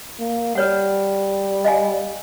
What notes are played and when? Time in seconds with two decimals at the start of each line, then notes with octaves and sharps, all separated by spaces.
0.19 A#3
0.55 G3 B4 C#5 F#5
1.65 D#5 F5 G#5